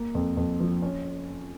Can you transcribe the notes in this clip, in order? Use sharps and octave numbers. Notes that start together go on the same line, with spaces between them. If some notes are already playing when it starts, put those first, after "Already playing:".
Already playing: A#3
F2
F2
F3
C#4